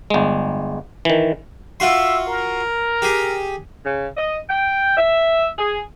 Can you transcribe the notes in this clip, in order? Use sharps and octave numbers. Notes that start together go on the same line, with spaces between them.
G1 G#3
D#3 E3
F4 F#4 E5 C6
A#4
G4 G#4
C#3
D#5
G5
E5
G#4